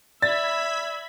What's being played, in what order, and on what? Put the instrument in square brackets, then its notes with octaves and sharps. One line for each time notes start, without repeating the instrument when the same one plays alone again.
[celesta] D5 [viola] E5 [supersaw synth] B5 G#6 B6 [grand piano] A6